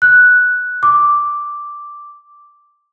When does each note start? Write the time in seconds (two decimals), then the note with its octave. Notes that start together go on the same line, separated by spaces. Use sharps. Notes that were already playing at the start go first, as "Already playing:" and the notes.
0.02 F#6
0.83 D6